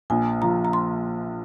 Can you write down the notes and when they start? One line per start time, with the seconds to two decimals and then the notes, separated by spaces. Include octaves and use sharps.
0.10 A#1 G#5
0.42 F3 A#5
0.65 A#5
0.73 C6